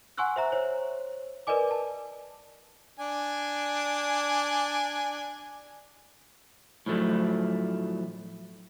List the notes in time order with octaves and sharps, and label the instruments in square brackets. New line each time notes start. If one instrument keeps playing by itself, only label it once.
[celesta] F#5 G#5 C6 C#6 E6 F#6
C5 E5 A#5
C5 C#5
A#4 B4 D5 D#5 G#5 D6
A5
[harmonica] D4 G#5
[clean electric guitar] A2 F3 F#3 A3